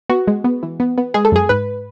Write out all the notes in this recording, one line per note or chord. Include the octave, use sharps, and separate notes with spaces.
B3 F#4
G#3
B3
E3
B3
B3
G#3 G#4
A4
F#2 G#4
G#2 B4